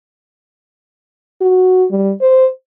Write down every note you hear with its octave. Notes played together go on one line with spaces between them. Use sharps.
F#4
G3
C5